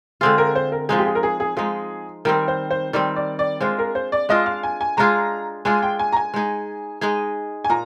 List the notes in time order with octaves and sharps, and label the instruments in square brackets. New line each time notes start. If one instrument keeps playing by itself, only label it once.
[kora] D3 G#3 C4 F4 [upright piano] G#4
[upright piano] A#4
C5
A#4
[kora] F3 G#3 D#4 [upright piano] G#4
[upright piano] G4
G#4
A#4
G#4
G#4
[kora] F3 G#3 D#4 [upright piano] G#4
[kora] D#3 G3 C4 [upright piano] A#4
[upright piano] C5
C5
[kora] D#3 G3 C4 [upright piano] D5
[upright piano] D5
D5
[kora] G#3 D4 F4 [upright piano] C5
[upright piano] A#4
C5
D5
[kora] G#3 D4 F4 [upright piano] D#5
[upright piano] F5
G#5
G#5
[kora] G#3 D4 F4 G#4 [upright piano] A#5
[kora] G#3 D4 F4 G#4 [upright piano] G#5
[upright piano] G5
G#5
A#5
G#5
[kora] G#3 D#4 G#4
G#3 D#4 G#4
[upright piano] G#5
[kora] A#2 [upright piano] A#5